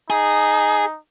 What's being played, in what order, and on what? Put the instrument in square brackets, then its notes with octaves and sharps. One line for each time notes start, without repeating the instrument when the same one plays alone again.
[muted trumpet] D#4 [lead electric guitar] G#4